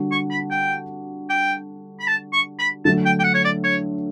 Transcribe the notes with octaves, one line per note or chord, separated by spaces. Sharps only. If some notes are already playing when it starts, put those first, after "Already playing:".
Already playing: D3 G3 D4 F#4
C#6
B5
G5
G5
B5
A5
C#6
B5
D3 F#3 A3 A5
G5
G5
F#5
C#5
D5
C#5